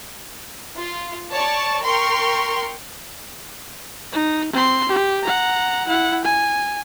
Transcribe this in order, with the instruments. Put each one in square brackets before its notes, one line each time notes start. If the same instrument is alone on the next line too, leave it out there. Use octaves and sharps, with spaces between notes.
[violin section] F4
C#5 D5 A5 C#6
A#4 G5 C6 C#6 F6
[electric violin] D#4
C4 C6
G4
F#5 A#5
E4 F#5
G#5